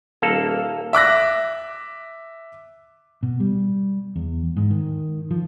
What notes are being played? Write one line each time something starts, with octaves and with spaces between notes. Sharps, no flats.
D#1 A#3 A4 F5
E5 D6 F#6 A#6
B2
G3
E2
G#2
D#3
F3